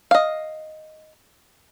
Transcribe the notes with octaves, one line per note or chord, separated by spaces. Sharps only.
D#5 F5